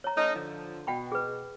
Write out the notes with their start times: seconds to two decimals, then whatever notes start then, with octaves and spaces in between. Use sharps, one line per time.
0.04 C#5 A#5
0.17 A3 C#4 D#4
0.35 D3 F3
0.87 B2 F#5 G5 B5
1.12 G#4 B4